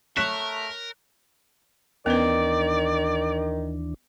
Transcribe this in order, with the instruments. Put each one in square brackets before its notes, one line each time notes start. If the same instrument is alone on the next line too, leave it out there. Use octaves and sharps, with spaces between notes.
[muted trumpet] A3 [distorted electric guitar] A#4 [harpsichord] C#5 C#6 [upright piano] F#6 B6 E7
[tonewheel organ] D#2 E3 D4 [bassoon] D#3 [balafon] B3 C#4 B4 [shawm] D5